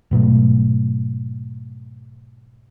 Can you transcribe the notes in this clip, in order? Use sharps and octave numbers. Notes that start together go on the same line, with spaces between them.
G#2 B2 F#3 A3